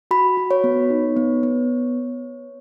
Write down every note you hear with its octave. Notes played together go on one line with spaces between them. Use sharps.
F#4 B5
F#4
C#5
B3
D#4
B3
B3